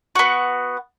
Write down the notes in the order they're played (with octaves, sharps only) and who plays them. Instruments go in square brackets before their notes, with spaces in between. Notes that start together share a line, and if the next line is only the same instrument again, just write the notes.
[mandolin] B3 F#4